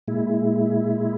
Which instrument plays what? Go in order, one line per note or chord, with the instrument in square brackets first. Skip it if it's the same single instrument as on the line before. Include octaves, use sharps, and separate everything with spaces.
[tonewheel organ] A#2 G#3 E4